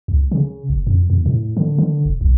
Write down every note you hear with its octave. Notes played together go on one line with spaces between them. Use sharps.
C#2
C#3
F#1
F2
E2
A2
D3
D3
E1
B1